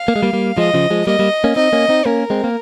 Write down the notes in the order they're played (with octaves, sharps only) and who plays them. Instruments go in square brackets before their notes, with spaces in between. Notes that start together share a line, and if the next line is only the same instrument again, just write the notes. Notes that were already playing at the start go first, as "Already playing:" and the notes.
Already playing: [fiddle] F5
[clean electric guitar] A#3
G#3
G3 A#3
G3 A#3
[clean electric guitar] F3 G#3 [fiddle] D#5
[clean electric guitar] C#3 F3
F3 G#3
[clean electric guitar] G3 A#3 [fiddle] D#5
[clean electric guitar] G3 A#3
A#3 C#4
[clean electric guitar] C4 D#4 [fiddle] D#5
[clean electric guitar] A#3 C#4
C4 D#4
[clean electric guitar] A#3 C#4 [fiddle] A#4
[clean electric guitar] G#3 C4
A#3